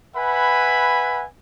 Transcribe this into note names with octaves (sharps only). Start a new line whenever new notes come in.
B4 E5 F#5 G#5 B5